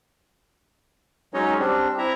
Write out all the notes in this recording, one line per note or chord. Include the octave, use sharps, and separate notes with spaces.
F#3 G#3 C#4 D#4 C#5 D#5
G3 C4 D4
C4 E4 E5 A#5